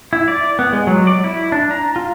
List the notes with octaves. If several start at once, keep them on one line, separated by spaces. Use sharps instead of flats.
E4
D5
B3
G#3
F#3
D5
E4
D4
A#5
F4